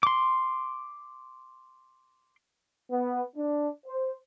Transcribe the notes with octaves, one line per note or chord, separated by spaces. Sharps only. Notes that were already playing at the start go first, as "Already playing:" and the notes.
C6 D6
B3
D4
C5